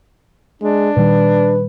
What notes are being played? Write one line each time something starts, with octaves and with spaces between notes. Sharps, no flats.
G#3 D4
A#2 D#3 G3 B4